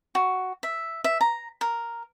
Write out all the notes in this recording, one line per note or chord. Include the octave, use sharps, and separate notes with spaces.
F#4
E5
E5
A#5
A#4